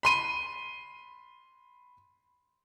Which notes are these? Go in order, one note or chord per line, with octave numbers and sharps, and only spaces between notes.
B5 C6 D#7